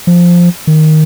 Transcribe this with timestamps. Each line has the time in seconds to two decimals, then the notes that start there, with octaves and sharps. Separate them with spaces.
0.07 F3
0.67 D#3